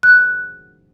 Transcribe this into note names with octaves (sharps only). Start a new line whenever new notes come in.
F#6